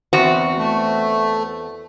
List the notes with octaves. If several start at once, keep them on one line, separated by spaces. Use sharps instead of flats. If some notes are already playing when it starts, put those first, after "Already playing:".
E2 C4 F#4
A3